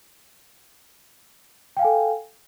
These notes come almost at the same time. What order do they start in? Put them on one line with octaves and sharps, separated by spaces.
G5 F5 G#5 A4